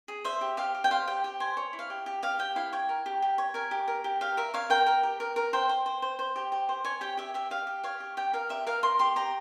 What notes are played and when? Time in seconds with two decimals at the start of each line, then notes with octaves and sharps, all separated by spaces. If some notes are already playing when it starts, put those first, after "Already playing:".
0.08 G#4
0.24 C5 E5
0.41 G4
0.57 G4 F5
0.75 G4
0.84 G5
0.91 C5 F5
1.07 G4 G5
1.24 G4
1.40 C5 G#5
1.57 C#5
1.73 E4
1.79 F5
1.90 G4
2.06 G4
2.23 G4 F5
2.39 G4 G5
2.56 E4 F5
2.73 C#5 G5
2.89 A#4
3.06 G4
3.22 G4
3.38 C#5
3.54 A#4 G#5
3.71 G4
3.88 A#4
4.04 G4
4.21 G4 F5
4.37 A#4 E5
4.54 C#5 F5
4.70 A#4 G5
4.86 A#4
5.03 G4
5.20 A#4
5.36 A#4
5.53 C5 G5
5.69 C5
5.86 C5
6.02 C5
6.19 C5
6.36 G4
6.52 G4
6.69 C5
6.85 C#5 G#5
7.01 G4 G5
7.17 G4 E5
7.34 G4 E5
7.50 G4 F5
7.67 G4
7.84 C#5 F5
8.00 G4
8.17 G4 G5
8.33 A#4 F5
8.49 G4 E5
8.67 A#4 F5
8.83 A#4 C6
8.99 G4 C6
9.16 G4 A#5